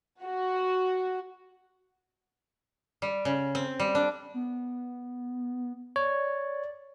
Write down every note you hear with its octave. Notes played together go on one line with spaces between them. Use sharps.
F#4
G3
C#3
C4
G3
D4
B3
C#5 D5